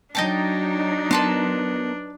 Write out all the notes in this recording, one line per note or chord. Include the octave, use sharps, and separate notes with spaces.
F#3 D4 D#4 D#5 G5 A5
B3 A#4 B4 A5 C6